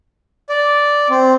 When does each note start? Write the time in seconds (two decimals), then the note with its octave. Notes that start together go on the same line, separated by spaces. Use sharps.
0.49 D5
1.10 C4